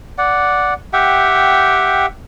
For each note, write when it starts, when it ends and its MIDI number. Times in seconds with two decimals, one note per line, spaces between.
0.18 0.74 74
0.18 0.74 78
0.93 2.06 67
0.93 2.06 76
0.93 2.06 78
0.93 2.06 79